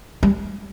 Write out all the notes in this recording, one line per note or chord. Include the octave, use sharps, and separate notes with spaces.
G3